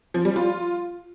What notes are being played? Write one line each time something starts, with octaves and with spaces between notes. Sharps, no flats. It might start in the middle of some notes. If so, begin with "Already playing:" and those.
F3
G3
F4